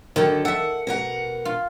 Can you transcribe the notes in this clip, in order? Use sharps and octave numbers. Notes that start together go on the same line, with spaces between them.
D3 D#3 F#3 A4
A4 E5 F#5
B2 A#4 F#5
F4